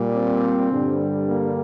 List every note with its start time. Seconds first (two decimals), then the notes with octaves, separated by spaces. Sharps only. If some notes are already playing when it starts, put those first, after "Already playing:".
Already playing: A#2 G3
0.16 C4
0.72 G2 D3 G3
1.29 A#3